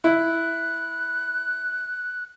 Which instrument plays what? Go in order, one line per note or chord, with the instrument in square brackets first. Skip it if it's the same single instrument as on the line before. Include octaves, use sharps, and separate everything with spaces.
[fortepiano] E4 [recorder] F#6